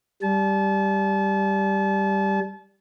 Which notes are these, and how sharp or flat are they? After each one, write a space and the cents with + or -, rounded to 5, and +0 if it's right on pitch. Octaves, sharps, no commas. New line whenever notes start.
G3 +0 A5 -35